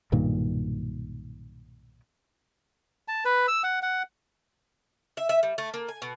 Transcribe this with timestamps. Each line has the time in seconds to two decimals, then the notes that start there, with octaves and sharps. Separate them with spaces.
0.12 B1 G2 A#2 D#3
3.08 A5
3.25 B4
3.48 E6
3.64 F#5
3.82 F#5
5.17 E5
5.29 E5
5.43 G3
5.58 A3
5.74 A#3
5.89 G#5
6.02 B2